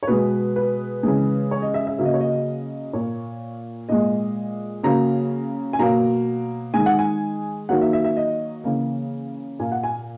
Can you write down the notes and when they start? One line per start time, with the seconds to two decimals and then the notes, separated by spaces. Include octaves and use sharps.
0.03 C#5
0.07 B2 G#3 B4
0.56 B4
1.03 C#3 E3 G#3
1.51 C#5
1.62 D#5
1.74 E5
1.87 E5
1.98 C#3 F#3 A#3 E5
2.05 D#5
2.14 C#5
2.21 D#5
2.93 A#2 A#3 C#5
3.89 A#2 G#3 D#5
4.83 C#3 F#3 A#3 A#5
5.73 G#5
5.79 B2 F#3 A#3 A#5
6.74 D#3 G#3 G#5
6.86 F#5
6.99 G#5
7.69 D#3 F#3 A#3 F#5
7.81 E5
7.93 E5
8.04 E5
8.17 D#5
8.64 C#3 E3 A#3
9.59 A#2 A#3 G#5
9.72 F#5
9.84 G#5